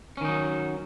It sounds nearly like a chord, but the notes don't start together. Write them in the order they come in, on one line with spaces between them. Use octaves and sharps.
C#4 D#3 D#4 F#3